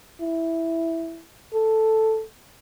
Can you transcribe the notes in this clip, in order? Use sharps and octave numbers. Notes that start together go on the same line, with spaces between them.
E4
A4